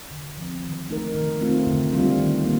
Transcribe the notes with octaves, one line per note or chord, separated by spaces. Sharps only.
D3
F3 C4
D#3
A3 D#4 A#4
D#3
A3 C4 F4
D3
G3 C4 F4
D#3
A#3